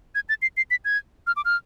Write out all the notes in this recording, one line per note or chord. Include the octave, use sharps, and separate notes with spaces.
G#6
A6
C7
C7
B6
G#6
F6
D6
F6